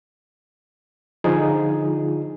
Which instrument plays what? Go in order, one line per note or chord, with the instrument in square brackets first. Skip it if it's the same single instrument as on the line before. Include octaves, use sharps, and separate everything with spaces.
[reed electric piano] D3 F3 D#4 F4 G#4